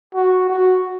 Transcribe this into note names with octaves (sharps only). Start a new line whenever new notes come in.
F#4
F#4